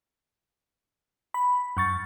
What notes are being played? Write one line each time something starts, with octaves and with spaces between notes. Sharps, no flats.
B5
F#2 C#6 A6